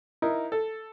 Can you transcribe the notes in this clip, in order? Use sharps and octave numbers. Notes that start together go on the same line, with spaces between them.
D#4 E4 A#4
A4